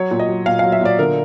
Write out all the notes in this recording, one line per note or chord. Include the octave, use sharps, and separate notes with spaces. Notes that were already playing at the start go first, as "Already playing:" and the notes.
Already playing: F#3 C#5
A#2
D#5
F#3
A#2 F5
F#3 F5
E5
A#2 D5
D3 A#4